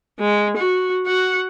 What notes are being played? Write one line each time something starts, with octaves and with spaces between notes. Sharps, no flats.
G#3
F#4
F#4 F#5